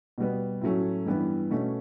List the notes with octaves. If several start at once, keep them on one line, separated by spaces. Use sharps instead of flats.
B2 G3 B3
A2 F#3 A3 C#4
G2 E3 G3 B3 E4
B2 A3 C#4